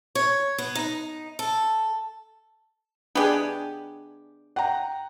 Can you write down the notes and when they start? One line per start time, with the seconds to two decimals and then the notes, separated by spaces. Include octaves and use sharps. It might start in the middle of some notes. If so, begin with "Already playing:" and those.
0.15 C#5
0.58 B3
0.75 D#4
1.39 A4
3.15 B3 D4 G4 G#4
4.56 F#5 G5 A#5